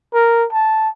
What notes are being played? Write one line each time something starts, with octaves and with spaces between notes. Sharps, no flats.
A#4
A5